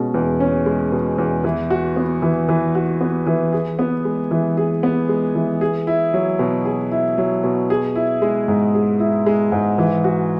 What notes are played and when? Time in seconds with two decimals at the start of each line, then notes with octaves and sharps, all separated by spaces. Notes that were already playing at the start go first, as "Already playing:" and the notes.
Already playing: B2 G#3 C#4
0.14 E2
0.40 C#4
0.66 G#3
0.92 B2
1.18 E2
1.44 E3
1.70 F#4
1.96 B3
2.22 E3
2.49 E3
2.75 F#4
3.01 B3
3.27 E3
3.53 G#4
3.79 B3
4.05 G#3
4.31 E3
4.57 G#4
4.83 B3
5.09 G#3
5.35 E3
5.61 G#4
5.87 E4
6.14 F#3
6.39 B2
6.65 G#4
6.91 E4
7.18 F#3
7.44 B2
7.70 G#4
7.95 E4
8.22 G#3
8.48 G#2
8.74 G#4
9.00 E4
9.26 G#3
9.52 G#2
9.78 E3
10.04 F#4